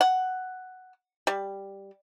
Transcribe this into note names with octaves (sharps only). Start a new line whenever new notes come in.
F#5
G3